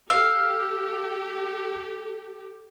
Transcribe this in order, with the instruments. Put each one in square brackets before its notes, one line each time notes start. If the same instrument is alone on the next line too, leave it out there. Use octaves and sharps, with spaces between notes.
[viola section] G4 A4 [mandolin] F5 [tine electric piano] E6